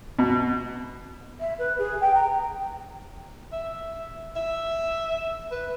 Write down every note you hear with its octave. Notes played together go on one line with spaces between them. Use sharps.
B2
E5
B4
G#4
G5
A#5
E5
E5
B4